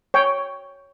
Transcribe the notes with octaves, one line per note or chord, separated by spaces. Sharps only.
C#5 G5